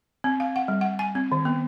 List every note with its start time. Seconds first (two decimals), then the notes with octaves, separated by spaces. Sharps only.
0.24 C4
0.40 F5
0.56 F#5
0.68 G3
0.81 F#5
0.99 G#5
1.15 C4
1.32 D#3
1.45 B3